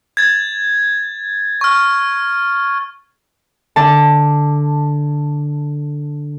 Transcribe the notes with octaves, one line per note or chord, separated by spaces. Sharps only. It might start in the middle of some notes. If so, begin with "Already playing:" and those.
G#6 A6
C#6 F6
D3 A5